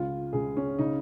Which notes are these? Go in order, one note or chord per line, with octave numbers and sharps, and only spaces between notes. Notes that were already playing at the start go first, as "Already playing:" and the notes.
Already playing: C#2 F4
C#2 G#4
C#4
C#3 D#4